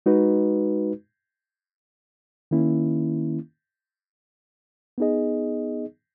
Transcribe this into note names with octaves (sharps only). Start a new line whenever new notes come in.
G#3 D#4 F#4 B4
D#3 A#3 C#4 E4
B3 D#4 G#4 D#5